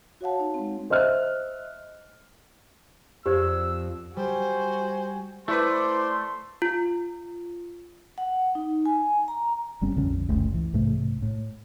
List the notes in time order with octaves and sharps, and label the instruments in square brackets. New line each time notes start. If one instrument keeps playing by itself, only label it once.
[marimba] F#4 C#5 F5 F#5 A5
D#4
G#3 C4
[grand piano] C5 D#5 E5 F6 F#6
[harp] F2 [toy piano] G4 C5 D5 [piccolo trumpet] E6
[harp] G3 [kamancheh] F#4 G#5 [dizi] C5
[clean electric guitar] A3 [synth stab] E4 B4 [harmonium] C5 D5 [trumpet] C6
[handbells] F4
[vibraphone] F#5
D#4
G#5
A#5
[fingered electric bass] G1 G3 C4 C#4
A#1 F2 D3 C#4
F#1 C#2 A3
E3
B1 G#2 C3 A3
A2